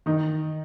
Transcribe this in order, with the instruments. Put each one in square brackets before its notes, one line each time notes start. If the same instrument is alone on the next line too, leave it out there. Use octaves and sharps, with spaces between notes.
[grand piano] D#3 D#4